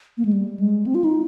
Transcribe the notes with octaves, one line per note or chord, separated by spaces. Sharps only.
A#3
G#3
G3
G#3
C4
F4
D#4